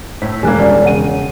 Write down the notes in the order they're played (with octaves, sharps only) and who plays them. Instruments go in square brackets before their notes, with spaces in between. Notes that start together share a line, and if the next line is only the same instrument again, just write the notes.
[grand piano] A2 [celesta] E6 B6
[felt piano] E1 [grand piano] G3 A#3 [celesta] G#5 F#6 G#6
[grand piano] F3 C#4 D4 [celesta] D5 A#5
[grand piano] C#3 [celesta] F#5 D#7